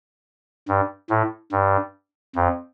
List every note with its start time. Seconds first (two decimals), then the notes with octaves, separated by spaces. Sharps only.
0.68 G2
1.10 A2
1.52 G2
2.36 F2